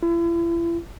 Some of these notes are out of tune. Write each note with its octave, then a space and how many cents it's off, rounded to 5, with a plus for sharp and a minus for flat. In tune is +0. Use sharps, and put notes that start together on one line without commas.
E4 +40